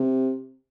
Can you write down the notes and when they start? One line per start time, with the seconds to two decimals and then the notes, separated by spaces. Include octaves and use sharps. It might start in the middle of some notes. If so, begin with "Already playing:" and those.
Already playing: C3